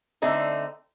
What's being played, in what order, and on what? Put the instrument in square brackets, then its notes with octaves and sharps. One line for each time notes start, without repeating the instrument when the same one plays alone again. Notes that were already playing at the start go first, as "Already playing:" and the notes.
[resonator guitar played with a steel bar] D3 A3 C4 D#4